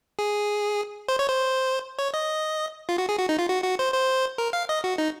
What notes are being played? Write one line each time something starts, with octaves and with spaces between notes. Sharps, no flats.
G#4
C5
C#5
C5
C#5
D#5
F4
F#4
G#4
F#4
D#4
F4
F#4
F#4
C5
C5
A#4
F5
D#5
F#4
D#4